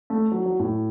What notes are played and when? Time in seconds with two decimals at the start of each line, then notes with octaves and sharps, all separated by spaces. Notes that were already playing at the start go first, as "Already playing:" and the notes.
0.10 A3
0.32 F#3
0.46 F#3
0.59 A2